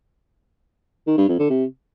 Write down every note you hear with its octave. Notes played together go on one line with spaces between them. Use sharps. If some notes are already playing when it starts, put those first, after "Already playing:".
D#3
G2
F2
D3
C3